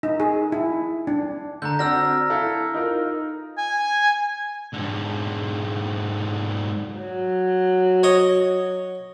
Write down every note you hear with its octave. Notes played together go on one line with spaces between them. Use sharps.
D#4
G#4
E4
D4
D3 A#5 G6
C4 D4 F#4 E6 F6 A#6
E4 A4 F5
D#4 F4 A#4
G#5
G#2 D3
F#3
C#5 D#5